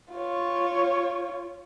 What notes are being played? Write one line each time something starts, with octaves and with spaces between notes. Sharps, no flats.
F4 C#5